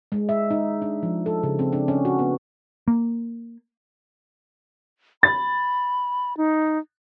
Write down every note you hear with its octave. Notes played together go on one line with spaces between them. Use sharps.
G#3
E5
D#4
D4
F3
A4
C#3
C4
D4
C#4
F#4
B3
A#3
B5 A6
D#4